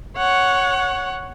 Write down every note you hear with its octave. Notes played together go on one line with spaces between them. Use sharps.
C#5 F#5